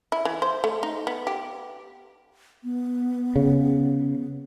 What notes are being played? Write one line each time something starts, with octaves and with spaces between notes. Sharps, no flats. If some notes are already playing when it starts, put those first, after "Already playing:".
E4
E3
C5
A3
D#4
B3
G4
B3
C#3